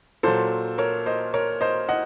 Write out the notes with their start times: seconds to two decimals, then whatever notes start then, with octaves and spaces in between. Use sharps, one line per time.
0.23 A#2 F#3 A4 C5
0.78 A#4 C#5
1.06 C5 D#5
1.34 A#4 C#5
1.61 C5 D#5
1.89 D#5 F#5